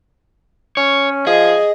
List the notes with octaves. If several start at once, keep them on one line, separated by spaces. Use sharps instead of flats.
C#4 C#5
F3 G#4 D#5